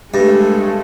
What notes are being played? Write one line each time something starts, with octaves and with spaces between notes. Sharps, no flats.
G2 G#3 A3